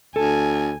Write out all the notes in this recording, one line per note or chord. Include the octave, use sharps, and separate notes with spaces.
D2 A4 G#5 A5